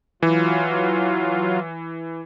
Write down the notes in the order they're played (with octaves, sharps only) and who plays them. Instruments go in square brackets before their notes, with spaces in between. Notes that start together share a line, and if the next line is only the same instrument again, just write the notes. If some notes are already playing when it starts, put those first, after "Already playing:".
[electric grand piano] E3 [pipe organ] F#3 F4